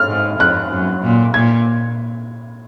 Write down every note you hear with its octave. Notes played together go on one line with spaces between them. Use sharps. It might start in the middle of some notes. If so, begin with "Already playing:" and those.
Already playing: F6
G#2
F2 F#6
F#2
A#2
A#2 G#6